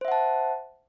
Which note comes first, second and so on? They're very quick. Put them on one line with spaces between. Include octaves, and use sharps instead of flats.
C5 E5 F#5 A5